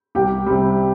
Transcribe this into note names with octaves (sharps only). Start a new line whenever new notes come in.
C2 G4 G5
C3 G3